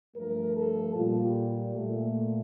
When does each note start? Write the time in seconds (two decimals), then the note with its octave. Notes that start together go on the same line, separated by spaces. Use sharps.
0.15 G2 F3 A3 A#4
0.56 A4
0.95 A#2 G3 F4
1.75 A#2 A3